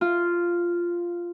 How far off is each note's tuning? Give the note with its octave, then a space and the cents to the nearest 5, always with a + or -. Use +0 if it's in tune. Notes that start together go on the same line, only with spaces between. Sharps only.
F4 -5